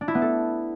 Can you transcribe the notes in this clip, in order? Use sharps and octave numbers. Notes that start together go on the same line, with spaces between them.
D4
E4
B3
A4